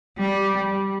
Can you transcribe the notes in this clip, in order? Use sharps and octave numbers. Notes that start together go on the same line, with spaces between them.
G3